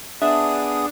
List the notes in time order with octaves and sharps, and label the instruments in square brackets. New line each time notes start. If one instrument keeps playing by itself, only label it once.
[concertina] B3 G#4 D#6 [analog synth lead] D4 [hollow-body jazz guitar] E5